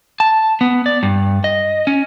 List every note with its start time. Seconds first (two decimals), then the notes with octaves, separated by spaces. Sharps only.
0.20 A5
0.61 B3
0.86 D5
1.03 G2
1.44 D#5
1.87 C#4